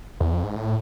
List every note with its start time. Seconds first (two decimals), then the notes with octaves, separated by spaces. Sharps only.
0.20 E2
0.32 F2
0.44 G#2
0.56 A2